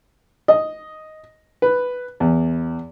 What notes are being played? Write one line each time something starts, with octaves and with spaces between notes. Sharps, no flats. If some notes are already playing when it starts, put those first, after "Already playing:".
D#5
B4
E2